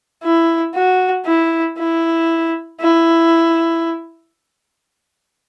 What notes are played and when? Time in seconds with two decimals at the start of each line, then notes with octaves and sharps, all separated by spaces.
0.24 E4
0.74 F#4
1.26 E4
1.78 E4
2.80 E4